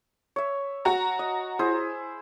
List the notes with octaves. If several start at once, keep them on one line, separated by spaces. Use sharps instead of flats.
C#5 E5
F#4 A#5
D#5
E4 G#4 C5